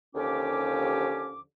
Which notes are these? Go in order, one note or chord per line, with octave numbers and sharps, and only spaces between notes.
D#2 D3 F3 C#4 G4 D6